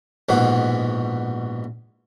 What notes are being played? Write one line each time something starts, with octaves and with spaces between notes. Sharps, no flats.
A#1 G#2 B2 F#4